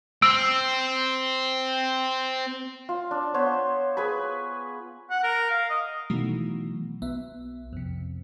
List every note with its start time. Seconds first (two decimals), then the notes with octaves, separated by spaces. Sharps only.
0.22 C4 E6 D7
2.89 F4
3.11 D4
3.34 B3 C5 C#5
3.97 G#4 B4 G#5 B5
5.10 F#5
5.23 A#4
5.50 F5
5.69 D#5
6.10 B2 D#3 E3 F#3 A3
7.02 B1 B3 E5
7.73 F2 C3